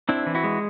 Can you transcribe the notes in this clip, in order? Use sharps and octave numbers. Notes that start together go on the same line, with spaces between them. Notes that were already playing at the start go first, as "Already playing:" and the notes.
C4 D4 E4
E3
E4 F#4
G#3